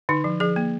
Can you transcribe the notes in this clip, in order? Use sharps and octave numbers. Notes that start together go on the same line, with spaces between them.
D3 D#4
F3
F3 G#4
A#3